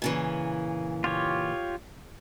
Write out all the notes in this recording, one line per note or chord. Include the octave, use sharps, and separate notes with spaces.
A#2 C#3 E3
F4 G4 C#5